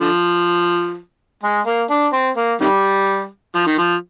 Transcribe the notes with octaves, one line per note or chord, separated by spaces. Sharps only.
D3 F3
G#3
A#3
D4
C4
A#3
C3 D#3 G3
F3
D#3
F3